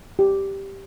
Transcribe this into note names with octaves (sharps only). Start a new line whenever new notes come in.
G4